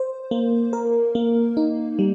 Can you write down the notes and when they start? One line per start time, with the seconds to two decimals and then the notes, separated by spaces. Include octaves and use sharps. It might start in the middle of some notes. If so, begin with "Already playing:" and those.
Already playing: C5
0.31 A#3
0.73 A#4
1.15 A#3
1.57 D#4
1.99 G3